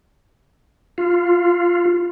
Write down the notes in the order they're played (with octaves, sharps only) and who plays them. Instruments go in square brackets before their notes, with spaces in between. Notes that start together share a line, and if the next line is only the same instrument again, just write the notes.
[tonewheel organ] F4